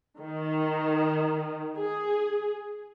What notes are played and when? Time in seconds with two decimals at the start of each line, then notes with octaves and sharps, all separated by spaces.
0.19 D#3
1.78 G#4